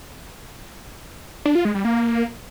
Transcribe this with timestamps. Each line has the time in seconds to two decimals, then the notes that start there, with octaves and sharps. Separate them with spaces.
1.45 D4
1.55 F4
1.65 G#3
1.75 G3
1.85 A#3